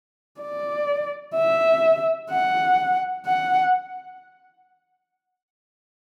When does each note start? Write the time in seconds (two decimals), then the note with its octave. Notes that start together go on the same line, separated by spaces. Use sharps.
0.41 D5
1.35 E5
2.31 F#5
3.26 F#5